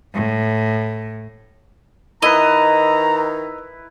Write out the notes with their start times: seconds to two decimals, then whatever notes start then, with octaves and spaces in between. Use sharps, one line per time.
0.14 A2
2.22 D#3 E4 B4 D#5 A#5